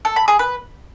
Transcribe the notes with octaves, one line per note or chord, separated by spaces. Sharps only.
A4
B5
G#4
B4